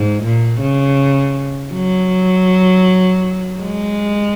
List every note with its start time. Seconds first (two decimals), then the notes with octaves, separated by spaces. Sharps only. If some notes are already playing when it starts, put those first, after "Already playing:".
Already playing: G#2
0.24 A#2
0.61 C#3
1.73 F#3
3.59 G#3